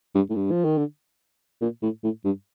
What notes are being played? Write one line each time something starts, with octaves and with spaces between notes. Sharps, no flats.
G2
A2
G2
F3
D#3
D3
A#2
A2
A2
G2